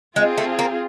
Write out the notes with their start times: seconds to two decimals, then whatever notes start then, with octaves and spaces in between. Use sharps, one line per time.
0.16 G#3 C4 F4 G#4
0.38 A3
0.59 A#3